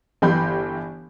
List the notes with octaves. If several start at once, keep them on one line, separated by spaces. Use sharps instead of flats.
G1 E3 G4 B5 C6 G6